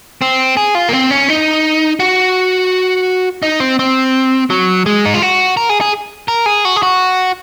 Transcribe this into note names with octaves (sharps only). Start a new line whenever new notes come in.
C4
G#4
F4
A#3
C4
C#4
D#4
F#4
D#4
C4
C4
F#3
G#3
D#4
F4
F#4
A#4
G#4
G#4
A#4
G#4
F#4
G#4
F#4